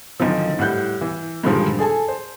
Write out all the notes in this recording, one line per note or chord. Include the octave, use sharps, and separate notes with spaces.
B1 D3 D#3 F3
A2 G3 F#5 F#6 G6
E3
G2 A#2 D3 D#3 F3 G#3
G#4 A4 G#5 A5
C5